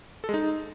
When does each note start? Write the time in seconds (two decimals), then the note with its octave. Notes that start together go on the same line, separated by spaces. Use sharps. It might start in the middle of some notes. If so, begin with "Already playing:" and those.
0.24 A4
0.29 G#3
0.34 D#4